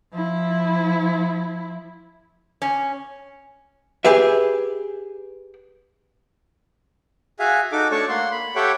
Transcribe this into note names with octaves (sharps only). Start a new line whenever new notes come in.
F3 E4
C#4
G4 G#4 B4 E5
F#4 G#4 E5 F5 G#5
D#4 F#4 A4 D6
A3 D4 A4 C#5 A5 C#6
A#3 F#5 C6
B5
G4 A4 C#5 E5 F#5 G5